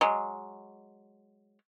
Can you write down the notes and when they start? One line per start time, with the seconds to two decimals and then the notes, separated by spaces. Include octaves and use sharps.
0.01 F#3 G#3